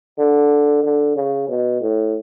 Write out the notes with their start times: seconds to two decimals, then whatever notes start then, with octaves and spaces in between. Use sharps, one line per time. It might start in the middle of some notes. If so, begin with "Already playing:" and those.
0.19 D3
0.83 D3
1.16 C#3
1.48 B2
1.81 A2